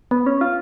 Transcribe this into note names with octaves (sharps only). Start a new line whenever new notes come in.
B3
C#4
F4